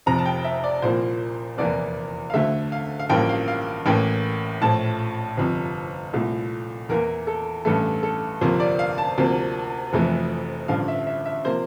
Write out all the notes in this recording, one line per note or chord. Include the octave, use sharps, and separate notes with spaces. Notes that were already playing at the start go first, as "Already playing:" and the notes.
F1 F2 C3 A#5
A5
G5
E5
D5
C2 A#2 F3 A#3 C5
F1 E2 E3 A#3 D5
F5
D2 D3 A3 E5
F5
F5
A1 G2 F3 A#3 G5
F5
F5
A1 A2 E3 A#3 G5
A#1 A2 F3 A5
G1 F2 C3
C2 A#2 A3
E2 E3 A#3 A#4
A4
A1 G2 E3 A3 A4
A4
G1 F2 C3 F3 A#3 C5
D5
F5
A5
D2 C3 F3 A#3
F1 F2 E3 A3
A1 G2 D3 F3 F5
E5
E5
E5
C3 F3 A#3 C5